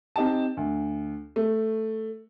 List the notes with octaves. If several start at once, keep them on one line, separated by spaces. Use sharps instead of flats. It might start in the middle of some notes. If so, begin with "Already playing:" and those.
C4 D#4 G4 A5
D2
A3